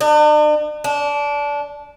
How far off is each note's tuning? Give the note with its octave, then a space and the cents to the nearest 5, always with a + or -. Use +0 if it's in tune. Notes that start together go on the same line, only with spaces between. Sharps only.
D4 +45
D4 -20